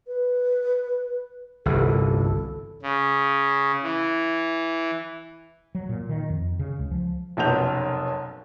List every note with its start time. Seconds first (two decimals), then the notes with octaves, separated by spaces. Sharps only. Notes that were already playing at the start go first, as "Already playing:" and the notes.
0.07 B4
1.66 G1 C2 E3 A4
2.82 C#3
3.83 E3
5.75 F#3
5.89 A#2
6.09 D#3
6.30 F2
6.59 C#3
6.79 C#2
6.91 F3
7.37 F1 B1 F#2 B2 G6 F7